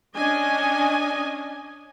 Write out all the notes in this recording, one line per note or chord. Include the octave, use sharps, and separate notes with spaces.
C#4 D4 D#5 G#5